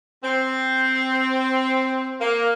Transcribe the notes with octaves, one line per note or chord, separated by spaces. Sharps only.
C4
A#3